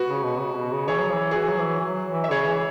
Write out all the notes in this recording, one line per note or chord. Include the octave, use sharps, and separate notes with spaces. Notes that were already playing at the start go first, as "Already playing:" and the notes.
Already playing: F#4 B4
C#3
B2
C#3
B2
C#3
E3 G#4 C#5
F#3
E3
G#4
E3 F#4 B4
F#3
E3
E3
F#3
E3
E5
C#3 G#4 C#5
E3